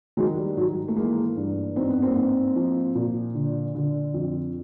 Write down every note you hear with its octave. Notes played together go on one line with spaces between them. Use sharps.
D#3 F#3 G#3
G3
G#2 F#3
A3
E3 G#3 A#3
G2
G#2 C4
B3
A#3 C4
G#2
F3
A#2
D3
D3
F2